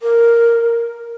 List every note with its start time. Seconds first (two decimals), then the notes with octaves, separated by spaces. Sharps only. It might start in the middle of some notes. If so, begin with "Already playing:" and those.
0.02 A#4